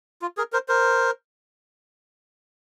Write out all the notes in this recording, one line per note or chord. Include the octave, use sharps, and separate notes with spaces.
F4
G#4 A#4
A#4 C5
A#4 C5